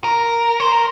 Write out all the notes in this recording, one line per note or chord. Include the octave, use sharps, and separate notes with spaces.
A#4
C5
A#4